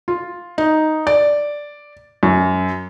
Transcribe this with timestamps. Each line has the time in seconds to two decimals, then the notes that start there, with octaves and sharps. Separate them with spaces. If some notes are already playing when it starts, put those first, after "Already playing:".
0.08 F4
0.58 D#4
1.07 D5
2.23 F#2